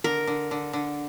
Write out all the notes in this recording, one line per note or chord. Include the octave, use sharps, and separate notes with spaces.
D3 A#4
D3
D3
D3